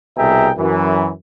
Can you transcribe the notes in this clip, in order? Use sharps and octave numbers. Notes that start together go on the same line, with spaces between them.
C2 B2 G#4 E5 G5 A#5
F#2 E3